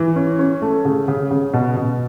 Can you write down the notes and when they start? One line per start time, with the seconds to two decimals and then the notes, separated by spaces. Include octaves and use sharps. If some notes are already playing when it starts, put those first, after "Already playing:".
Already playing: E3
0.16 C#4
0.39 C#4
0.62 A3
0.85 C#3
1.08 C#3
1.31 C#3
1.53 B2
1.76 B2